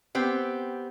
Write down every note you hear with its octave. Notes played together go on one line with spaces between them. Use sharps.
B3 C4 G4